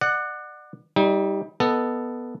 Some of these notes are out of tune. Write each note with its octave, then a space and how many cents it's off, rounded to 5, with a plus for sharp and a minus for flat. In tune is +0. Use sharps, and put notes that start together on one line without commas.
D5 +35 F#5 +0
G3 +0 D#4 +35
B3 -5 A4 +0 D#5 +0